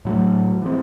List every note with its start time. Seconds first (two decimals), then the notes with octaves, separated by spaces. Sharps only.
0.05 A2 F#3 A3
0.62 E3 G#3 C4